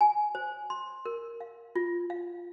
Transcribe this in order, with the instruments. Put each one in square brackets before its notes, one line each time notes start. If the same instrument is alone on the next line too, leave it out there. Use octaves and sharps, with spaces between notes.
[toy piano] G#5
C5
C6
A#4
F5
F4
F5